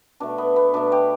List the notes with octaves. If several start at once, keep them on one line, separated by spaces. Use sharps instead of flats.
B2 A3 D4
B3
B3
B2 A3 D4
G4